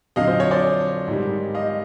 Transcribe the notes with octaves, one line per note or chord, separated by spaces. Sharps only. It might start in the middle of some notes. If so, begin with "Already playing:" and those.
F2 D3 F#3 D#5 F5
C5
C#5
C5 D5
G#2 D#3 G3
D#5 F5